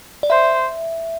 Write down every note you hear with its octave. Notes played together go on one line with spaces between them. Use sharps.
D5
C5 E5